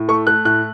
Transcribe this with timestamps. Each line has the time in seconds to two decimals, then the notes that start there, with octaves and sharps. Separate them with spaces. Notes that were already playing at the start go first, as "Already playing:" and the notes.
Already playing: A2
0.08 A3 C#6
0.27 A3 F#6
0.45 A2 F#6